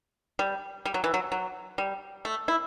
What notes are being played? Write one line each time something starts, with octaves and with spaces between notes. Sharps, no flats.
G3
G3
F#3
E3
F#3
F#3
G3
A3
E4